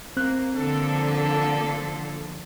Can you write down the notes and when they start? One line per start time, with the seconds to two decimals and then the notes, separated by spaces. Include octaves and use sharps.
0.17 A#3 C4 F#6
0.56 D3 F3 A#3 A4